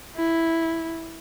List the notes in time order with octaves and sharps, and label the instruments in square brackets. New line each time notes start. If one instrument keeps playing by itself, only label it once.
[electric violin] E4